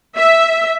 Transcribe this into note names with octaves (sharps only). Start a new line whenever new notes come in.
E5